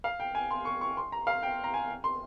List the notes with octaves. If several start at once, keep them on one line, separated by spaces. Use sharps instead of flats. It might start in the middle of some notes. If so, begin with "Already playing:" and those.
F5
G5
G#5
C6
C#6
C#6
C6
A#5
F5
G5
A#5
G#5
C6